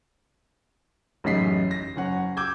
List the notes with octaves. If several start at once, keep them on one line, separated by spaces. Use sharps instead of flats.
A1 F#2 C#3 D#4 B6 C7
A#6
F#1 C#4 F#5
D6 E6 G6 G#6